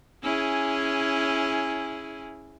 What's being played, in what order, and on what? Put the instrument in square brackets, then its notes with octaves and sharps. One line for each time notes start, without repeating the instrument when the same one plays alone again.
[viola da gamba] C#4 E4 G#4